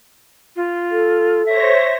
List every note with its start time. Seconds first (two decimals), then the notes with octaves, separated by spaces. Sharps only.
0.56 F4
0.91 A4
1.45 C5 C#5 E5 A#6